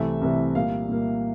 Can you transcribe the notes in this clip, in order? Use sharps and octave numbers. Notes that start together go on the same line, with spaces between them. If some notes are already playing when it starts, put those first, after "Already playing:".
Already playing: C2 C3 E3 A3 E5
C2 C3 E3 A3
A#2 G3 A#3 F5
A#2 G3 A#3